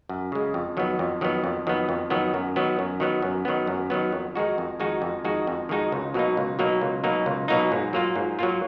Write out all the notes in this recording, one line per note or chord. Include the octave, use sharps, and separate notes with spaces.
F#2
C#3 G#3
F2
D#3 F#3 B3
F2
D#3 F#3 B3
F2
D#3 F#3 B3
F2
D#3 F#3 B3
F#2
D#3 F#3 B3
F#2
D#3 F#3 B3
F#2
D#3 F#3 B3
F#2
D#3 F#3 B3
F2
D#3 G#3 D#4 F#4
F2
D#3 G#3 D#4 F#4
F2
D#3 G#3 D#4 F#4
F2
D#3 G#3 D#4 F#4
C#2
B2 F#3 A#3 D#4
C#2
B2 F#3 A#3 D#4
C#2
B2 F#3 A#3 D#4
C#2
B2 F#3 A#3 D#4
G#2
F#3 A#3 F4
G#2
F#3 A#3 F4